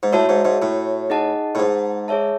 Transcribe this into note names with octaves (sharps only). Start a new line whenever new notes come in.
G#2
A2 F#4 C#5 E5 A5
G#2
G#2
A2
D#4 G#4 D#5 F#5 A5
A2
G#2
G#4 C#5 E5 A5